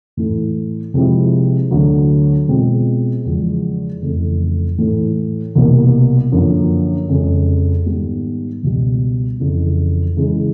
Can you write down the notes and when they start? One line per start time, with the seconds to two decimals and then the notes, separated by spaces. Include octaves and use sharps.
0.17 A2 E3 A3
0.94 C3 F3 G#3 C4 E4
1.71 D2 D3 F#3
2.48 B2 G#3 C4 F4
3.25 E2 C#3 F3 G#3
4.02 F2 C#3 E3 A3
4.78 A2 E3 A3
5.55 C2 B2 G3 A#3
6.32 F#2 D3 F3 A#3
7.09 F2 C#3 F3 G#3 C#4
7.86 G#2 D#3 G3 B3
8.63 C#2 B2 G3
9.39 F2 C#3 E3
10.17 C#3 E3 G#3